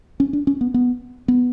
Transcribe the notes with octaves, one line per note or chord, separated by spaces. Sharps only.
C#4
D4
C#4
B3
B3
B3